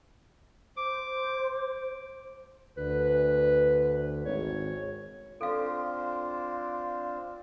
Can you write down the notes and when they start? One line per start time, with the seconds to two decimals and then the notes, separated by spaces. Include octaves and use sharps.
0.77 C5 D6
2.77 D2 B4
4.25 G#1 C#5
5.41 C4 D4 F4 A4 F5